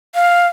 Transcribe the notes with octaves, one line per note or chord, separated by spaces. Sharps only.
F5